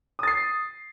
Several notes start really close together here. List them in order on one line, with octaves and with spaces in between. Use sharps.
D#6 A6 C7